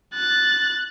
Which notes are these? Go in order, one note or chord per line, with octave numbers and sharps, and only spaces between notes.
F#6 A6